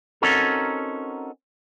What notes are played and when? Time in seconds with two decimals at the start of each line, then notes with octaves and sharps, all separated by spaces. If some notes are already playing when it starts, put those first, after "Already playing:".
0.22 C4 C#4 D#4 F#4 A4 A#4